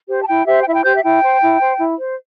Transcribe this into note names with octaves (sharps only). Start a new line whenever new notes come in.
G4 C5
A5
E4 G5
G4 C5 E5
G5
E4 E5
G5
G4 C5 G6
E5
E4 G5
C5
E4
C5
E4
C5